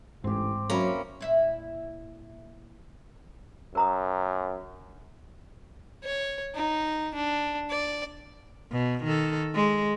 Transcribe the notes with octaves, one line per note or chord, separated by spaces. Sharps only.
A1 G#2 C4 G4
F#3 A#3 C#4 D5 E5 B5
A#2 E4 E5
F#2 A#4 A#5 D#6
C#5
D#4
D4
D5
B2
D#3 A4
G#3